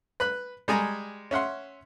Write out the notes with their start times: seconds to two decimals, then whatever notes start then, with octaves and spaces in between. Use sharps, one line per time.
0.20 B4 B5 F#6
0.68 G3 G#3 G#5 A#5
1.31 C#4 E5 F#5 C6